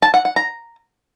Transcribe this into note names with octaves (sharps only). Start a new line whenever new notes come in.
A5
F#5
F#5
A#5